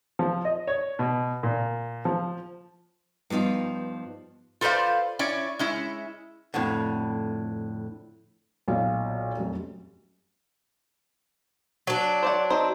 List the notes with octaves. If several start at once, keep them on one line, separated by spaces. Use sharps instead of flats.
F3
D#5
C#5
B2
A#2
F3
G2 F3 B3 D#4 F4
F4 A4 B4 C5 D5 F5
C#4 E4 C#5 D5
G#3 C#4 E4
F2 A2 D3
B1 A#2 F5
F1 F#2
F#3 D4
C5 D5 F#5
C4 D#4 C5